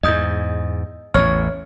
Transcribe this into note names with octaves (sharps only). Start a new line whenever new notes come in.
E2 G#2 D#5 D#6 G6
A1 E2 A2 C#5 F6